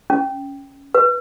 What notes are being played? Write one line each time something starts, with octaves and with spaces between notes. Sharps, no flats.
C#4
B4